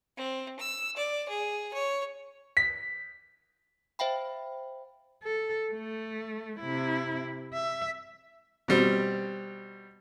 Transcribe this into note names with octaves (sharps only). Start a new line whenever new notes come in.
C4
E6
D5
G#4
C#5
B6
C5 E5 F5 G5 B5
A4
A3
C3 E4
E5
B2 G3 C4